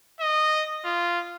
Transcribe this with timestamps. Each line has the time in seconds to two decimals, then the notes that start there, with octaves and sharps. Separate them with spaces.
0.21 D#5
0.85 F4